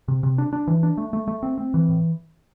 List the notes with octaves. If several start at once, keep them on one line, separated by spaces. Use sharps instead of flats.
C3
C3
D4
D4
E3
D4
A3
A3
A3
C4
C4
E3
A2